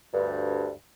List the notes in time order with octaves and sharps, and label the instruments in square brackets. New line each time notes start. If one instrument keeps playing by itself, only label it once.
[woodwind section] D2 G2